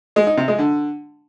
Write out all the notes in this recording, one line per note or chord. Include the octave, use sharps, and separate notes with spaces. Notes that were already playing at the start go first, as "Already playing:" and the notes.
G#3
D#4
C3
G#3
D3